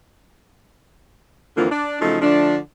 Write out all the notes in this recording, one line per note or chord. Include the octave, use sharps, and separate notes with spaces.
F2 D3 E3 F3 A#3 F4
D4
C#3 F3 F#3 A3 D#4
D3 F3 A3 D4